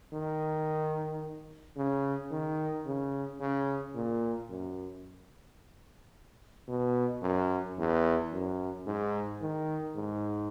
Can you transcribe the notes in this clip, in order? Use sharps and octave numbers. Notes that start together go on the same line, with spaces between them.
D#3
C#3
D#3
C#3
C#3
A#2
F#2
B2
F#2
E2
F#2
G#2
D#3
G#2